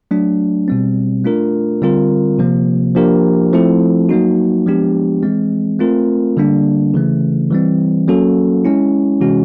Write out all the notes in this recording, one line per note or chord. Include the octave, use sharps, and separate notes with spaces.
F#3 A3 D4
B2 G3 C4
A3 D4 F4 A#4
D3 G3 C4 F4 A#4
C3 F3 A#3
F3 A#3 D4 G4 A#4
F3 A3 C4 E4 A4
F#3 A#3 D#4 F#4
F3 G#3 B3 D4 G4
E3 G#3 C4
A3 C4 F4 A#4
D3 G3 A#3 D4
C#3 E3 A3
E3 G3 C4
F#3 A#3 C#4 F#4 A4
G#3 C#4 E4
C3 E3 G#3 C#4 F#4